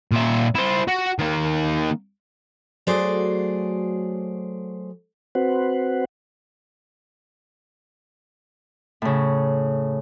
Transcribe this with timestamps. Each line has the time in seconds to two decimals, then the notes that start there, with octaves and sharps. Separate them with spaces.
0.12 A#2 E5
0.55 E4 C5
0.88 F#4
1.19 D#3 A#3
2.87 F#3 A3 F#4 G#4 C5 D5
5.35 C4 F#4 B4 C5 F#5
9.02 A2 C#3